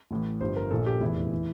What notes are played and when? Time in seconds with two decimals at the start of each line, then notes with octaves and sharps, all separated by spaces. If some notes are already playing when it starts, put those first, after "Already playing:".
0.11 A1 A2 E3
0.41 G1 G2 F3 C5
0.57 A#4
0.71 A#1 A#2 F3 A4
0.86 G4
1.01 F1 E2 E3 E4
1.31 E3